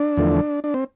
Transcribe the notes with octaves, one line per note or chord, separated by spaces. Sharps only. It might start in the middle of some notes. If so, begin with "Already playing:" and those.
Already playing: D4
E2 D3 F3 A3
D4
C4